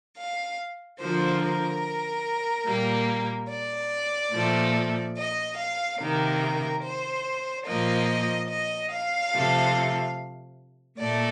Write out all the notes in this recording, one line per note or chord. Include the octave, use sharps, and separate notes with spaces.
F5
D3 F3 A#3 C5
A#4
A#2 G3 A#3
D5
A#2 F3 A3
D#5
F5
C3 D#3 A#3 A#4
C5
A#2 F3 A#3 D#5
D#5
F5
C3 F3 A3
A#2 A3 D5